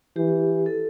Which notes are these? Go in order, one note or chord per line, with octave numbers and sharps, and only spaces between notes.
E3 G4
A4